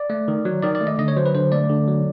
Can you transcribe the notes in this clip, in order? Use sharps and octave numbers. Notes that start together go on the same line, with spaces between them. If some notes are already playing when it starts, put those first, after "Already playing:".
Already playing: D5
A3
D#3
F#3
D#3 D5
D5
A3
D#5
D3 D#5
C#5
F#3 C5
B4
D3 C5
A3 D5
D3
F#3